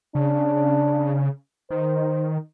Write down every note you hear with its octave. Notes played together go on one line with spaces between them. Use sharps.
C#3 D4
D#3 C5